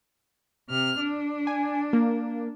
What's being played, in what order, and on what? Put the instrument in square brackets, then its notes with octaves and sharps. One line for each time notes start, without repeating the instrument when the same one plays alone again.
[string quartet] C3 F6
D4
[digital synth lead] G#5
A#3